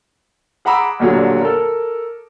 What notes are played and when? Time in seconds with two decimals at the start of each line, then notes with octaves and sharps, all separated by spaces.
0.65 G#4 F#5 A#5 B5 D6 E6
1.00 B1 A#2 D3 F#3 G3
1.42 A4 A#4